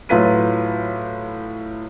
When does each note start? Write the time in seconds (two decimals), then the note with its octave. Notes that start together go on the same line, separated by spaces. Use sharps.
0.09 A2 F#3 F4 B4 B6 D#7